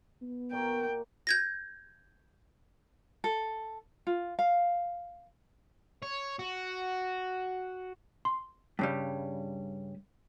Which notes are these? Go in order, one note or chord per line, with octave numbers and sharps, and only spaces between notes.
B3
A#2 A#3 F#4 G5
G6 G#6 A#6
A4
F4
F5
C#5
F#4
C6
G2 C#3 G3